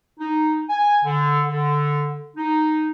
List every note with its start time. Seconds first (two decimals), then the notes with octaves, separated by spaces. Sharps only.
0.20 D#4
0.69 G#5
1.04 D3
1.47 D3
2.37 D#4